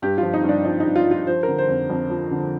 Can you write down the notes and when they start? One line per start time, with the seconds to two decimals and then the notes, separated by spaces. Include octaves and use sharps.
0.02 G2 G4
0.18 F3 F4
0.34 D#4
0.44 G2
0.49 D4
0.65 F3 D#4
0.80 D#4
0.85 G2
0.96 F4
1.06 F3
1.11 F4
1.27 F3 C5
1.43 A#4
1.48 D3
1.58 C5
1.68 F2
1.90 F2
2.10 F3
2.31 D3